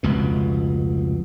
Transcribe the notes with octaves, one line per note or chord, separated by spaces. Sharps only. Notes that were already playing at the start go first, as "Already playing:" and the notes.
F1 C#2 B2